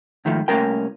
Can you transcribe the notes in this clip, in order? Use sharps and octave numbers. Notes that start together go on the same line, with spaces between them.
G#2 D#3 F3 A3
C2 A3 A#3 C#4 A#4 G5